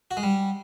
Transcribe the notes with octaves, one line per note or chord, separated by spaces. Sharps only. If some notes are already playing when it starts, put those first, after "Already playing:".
F#4
G#3
G3